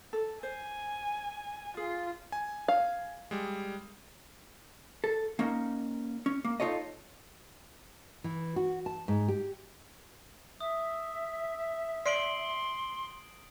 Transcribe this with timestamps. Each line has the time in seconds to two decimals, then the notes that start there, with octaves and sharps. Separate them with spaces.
0.13 A4
0.43 C5 G#5
1.77 F4 G#4
2.32 G#5
2.68 F5
3.31 G3 G#3
5.04 A4
5.39 A#3 C#4 D#4
6.26 C#4
6.44 A#3
6.60 D#4 F4 A4 C#5 D#5
8.24 E3
8.56 F#4
8.86 A5
9.08 G#2
9.28 G4
10.61 E5 D#6
12.06 D5 C6 C7 D7 F#7